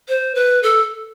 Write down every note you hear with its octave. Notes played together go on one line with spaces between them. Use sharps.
C5
B4
A4